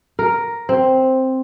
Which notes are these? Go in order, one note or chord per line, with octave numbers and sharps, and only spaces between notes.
A#4
C4